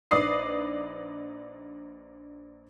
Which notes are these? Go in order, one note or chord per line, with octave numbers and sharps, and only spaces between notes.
A#1 D#4 B4 D5 D#6 C7